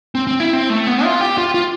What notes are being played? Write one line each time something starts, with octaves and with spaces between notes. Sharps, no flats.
C4
C4
E4
C4
A3
B3
F4
G4
F4
F4